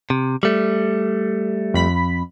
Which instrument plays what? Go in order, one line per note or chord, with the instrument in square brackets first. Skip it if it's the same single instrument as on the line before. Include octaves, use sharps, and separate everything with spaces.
[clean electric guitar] C3
G3 A3
[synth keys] F2 B5 B6